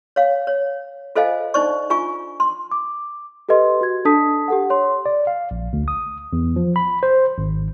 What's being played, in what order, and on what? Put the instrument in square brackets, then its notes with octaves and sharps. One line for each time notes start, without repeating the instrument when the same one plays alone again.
[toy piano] C#5 F5
C#5
F4 A4 C5 D#5 F5 G#5
D4 D#4 C5 D5 C#6
D4 F4 G#5 C#6
C6
[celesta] D6
G4 A4 B4 D#5 C6
F#4 G#6
D4 A4 A5 D#6 B6
G4 A4 F#5
C#5 C6
[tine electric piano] D5
F5
A#1
D2
D#6
E2
F3
B5
C5
G#1